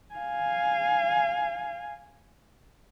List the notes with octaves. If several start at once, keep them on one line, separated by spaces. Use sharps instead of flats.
F5 G#5